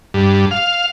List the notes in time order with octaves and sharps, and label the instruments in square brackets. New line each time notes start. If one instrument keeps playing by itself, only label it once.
[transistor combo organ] G2
F5